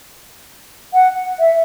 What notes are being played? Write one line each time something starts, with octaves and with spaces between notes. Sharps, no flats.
F#5
E5